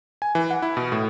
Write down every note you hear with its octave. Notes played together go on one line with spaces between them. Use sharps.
G#5
E3
F#5
E4
B2
A2